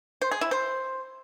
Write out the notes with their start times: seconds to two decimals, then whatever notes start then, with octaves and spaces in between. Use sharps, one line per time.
0.22 C5
0.31 G#4
0.41 E4
0.51 C5